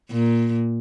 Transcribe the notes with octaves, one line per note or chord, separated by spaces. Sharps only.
A#2